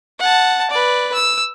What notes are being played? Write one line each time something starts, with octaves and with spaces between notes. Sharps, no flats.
F#5 A5
B4 D5
E6